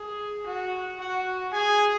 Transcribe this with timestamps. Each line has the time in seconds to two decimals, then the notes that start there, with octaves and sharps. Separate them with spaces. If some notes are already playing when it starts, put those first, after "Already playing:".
Already playing: G#4
0.46 F#4
1.00 F#4 F#5
1.53 G#4 G#5